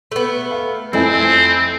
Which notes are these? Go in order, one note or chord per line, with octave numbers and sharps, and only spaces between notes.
A3 B3
F5
F2 A3 C4 E4 G#5